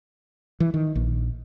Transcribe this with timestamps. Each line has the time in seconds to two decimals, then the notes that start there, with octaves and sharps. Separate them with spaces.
0.60 E3
0.74 D#3
0.95 A#1